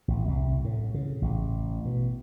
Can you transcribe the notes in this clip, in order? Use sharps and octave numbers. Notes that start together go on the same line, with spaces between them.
A1
C2
A2
C#3
A1
B2